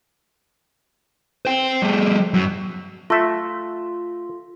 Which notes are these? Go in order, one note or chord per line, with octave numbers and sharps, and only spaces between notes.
C5 G5
G3 A3
F#2
A3 F4 E5